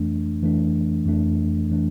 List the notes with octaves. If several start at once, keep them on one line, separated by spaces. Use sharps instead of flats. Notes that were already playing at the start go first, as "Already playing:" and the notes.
Already playing: F2 E3 A3 D4
F2 E3 A3 D4
F2 E3 A3 D4
E3 A3 D4